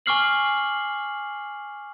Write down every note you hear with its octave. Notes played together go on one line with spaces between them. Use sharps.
G#5 C#6 D6 F6 C7 F#7